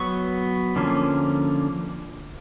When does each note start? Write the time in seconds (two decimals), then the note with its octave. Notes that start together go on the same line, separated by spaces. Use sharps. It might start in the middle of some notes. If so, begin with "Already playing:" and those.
Already playing: F#3 B3 C#6
0.76 D3 F3 A#3 C#4